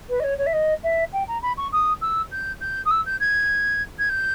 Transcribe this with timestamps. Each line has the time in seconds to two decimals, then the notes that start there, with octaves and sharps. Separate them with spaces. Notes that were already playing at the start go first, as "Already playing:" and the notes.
0.09 B4
0.19 D#5
0.23 C#5
0.38 C#5
0.46 E5
0.53 D#5
0.83 E5
1.13 G5
1.27 A#5
1.42 B5
1.57 C#6
1.72 D#6
2.01 E6
2.31 G6
2.60 G6
2.85 D#6
2.90 E6
3.06 G6
3.20 G#6
3.98 G#6
4.09 G6